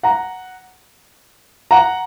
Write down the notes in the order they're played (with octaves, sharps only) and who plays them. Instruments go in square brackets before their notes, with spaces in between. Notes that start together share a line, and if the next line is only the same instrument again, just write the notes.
[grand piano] F#5 A#5
F#5 A#5